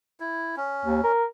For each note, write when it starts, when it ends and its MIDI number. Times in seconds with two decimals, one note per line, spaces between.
0.20 0.55 64
0.56 1.12 61
0.85 1.02 39
1.04 1.24 70